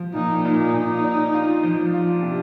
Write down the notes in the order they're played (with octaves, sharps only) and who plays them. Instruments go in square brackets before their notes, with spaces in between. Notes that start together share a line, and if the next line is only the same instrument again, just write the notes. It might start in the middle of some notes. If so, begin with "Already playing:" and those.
Already playing: [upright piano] F3
[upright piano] A#2 [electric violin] D#4
[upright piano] A#2 [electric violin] D#4
[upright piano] A#2
D4
F4
F3
[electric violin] D4 [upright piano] F4
[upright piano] C3